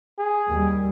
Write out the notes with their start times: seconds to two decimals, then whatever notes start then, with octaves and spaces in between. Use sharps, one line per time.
0.19 G#4
0.49 D#2 G3